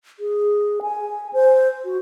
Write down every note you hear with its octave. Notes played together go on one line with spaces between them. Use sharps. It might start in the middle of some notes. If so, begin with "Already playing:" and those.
G#4
G#5
C5
F#4